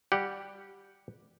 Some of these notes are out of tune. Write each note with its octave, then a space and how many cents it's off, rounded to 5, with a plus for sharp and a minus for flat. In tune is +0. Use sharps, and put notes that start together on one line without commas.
G3 +0 G4 -5 F#5 +0